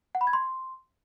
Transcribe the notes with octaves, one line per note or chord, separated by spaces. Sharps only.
F#5
B5
G#6
C6